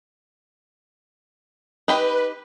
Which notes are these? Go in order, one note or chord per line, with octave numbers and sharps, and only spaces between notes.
D#4 G4 B4 B5